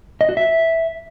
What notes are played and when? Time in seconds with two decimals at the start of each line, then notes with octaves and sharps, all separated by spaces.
0.21 D#5
0.29 F#4
0.37 E5